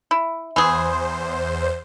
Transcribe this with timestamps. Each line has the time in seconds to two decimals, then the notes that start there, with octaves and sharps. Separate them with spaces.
0.11 E4
0.56 E2 E3 G#4 C5